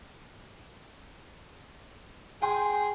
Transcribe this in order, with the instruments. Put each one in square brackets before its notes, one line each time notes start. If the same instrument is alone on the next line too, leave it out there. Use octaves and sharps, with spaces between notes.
[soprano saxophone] G#4 [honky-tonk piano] G5 G#5 C6